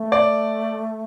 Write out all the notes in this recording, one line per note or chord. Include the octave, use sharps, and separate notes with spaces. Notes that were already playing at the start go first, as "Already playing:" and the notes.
Already playing: A3
D5